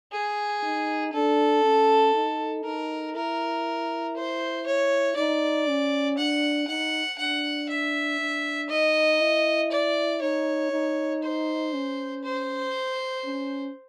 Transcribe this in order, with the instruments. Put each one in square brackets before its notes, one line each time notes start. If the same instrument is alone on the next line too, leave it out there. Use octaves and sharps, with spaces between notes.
[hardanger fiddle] G#4
[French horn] D#4
[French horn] D4 [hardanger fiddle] A4
[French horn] C#4
D#4
[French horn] D#4 [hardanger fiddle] A#4
[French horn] E4 [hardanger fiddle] A#4
[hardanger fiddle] C5
C#5
[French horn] D#4 [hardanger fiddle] D5
[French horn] C#4
[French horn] D4 [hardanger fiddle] F#5
[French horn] D#4 [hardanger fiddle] F#5
[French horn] D4 [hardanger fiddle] F#5
[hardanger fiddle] E5
[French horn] D4
[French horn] D#4 [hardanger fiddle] D#5
[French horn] E4
[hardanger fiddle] D5
[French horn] D#4 [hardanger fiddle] C#5
[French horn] D#4
[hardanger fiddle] C5
[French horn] C#4
[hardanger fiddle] C5
[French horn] C#4